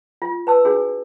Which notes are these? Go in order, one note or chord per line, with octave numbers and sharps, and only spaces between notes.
F4
B4 A5 E6
D4 F#4 G#4